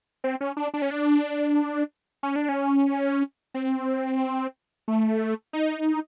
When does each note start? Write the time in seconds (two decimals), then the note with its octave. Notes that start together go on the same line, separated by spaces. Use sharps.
0.24 C4
0.41 C#4
0.57 D4
0.74 D4
0.82 C#4
0.91 D4
2.23 C#4
2.36 D4
2.49 C#4
3.54 C4
4.88 A3
5.53 D#4